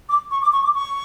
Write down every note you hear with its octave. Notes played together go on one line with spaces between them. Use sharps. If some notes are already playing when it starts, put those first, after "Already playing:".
D6
C#6
D6
C#6
D6
C#6